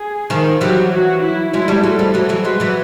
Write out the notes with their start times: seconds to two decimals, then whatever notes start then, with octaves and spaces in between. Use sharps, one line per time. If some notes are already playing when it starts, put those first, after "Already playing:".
Already playing: G#4
0.30 D#3 F3
0.61 E3 F#3 G4
0.92 F#4
1.22 E4
1.53 F#3 G#3 E4
1.68 G3 A3
1.83 F#3 G#3 A4
1.99 F3 G3
2.14 E3 F#3 A4
2.29 E3 F#3
2.44 F#3 G#3 B4
2.60 E3 F#3